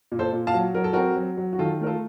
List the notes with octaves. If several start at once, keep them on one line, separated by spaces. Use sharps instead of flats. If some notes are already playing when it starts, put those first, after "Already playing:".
A#2
A4 C5
A#2
F5 A5
F#3
F#3 A#4
A4
C4 F#4 A#4
F#3
F#3
F#4
D#3 F4 A4
A3 A#4
F4 A4